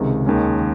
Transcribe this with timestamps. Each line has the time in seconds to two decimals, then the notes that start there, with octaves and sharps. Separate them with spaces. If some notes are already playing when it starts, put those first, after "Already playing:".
Already playing: C#2 C3 D#3 G#3
0.26 D#2 D#3 G#3 C#4